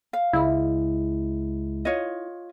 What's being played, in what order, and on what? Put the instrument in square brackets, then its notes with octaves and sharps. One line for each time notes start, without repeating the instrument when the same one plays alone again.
[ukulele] F5
[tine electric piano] C#2 G#3 [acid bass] E4
[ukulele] F4 C#5 D#5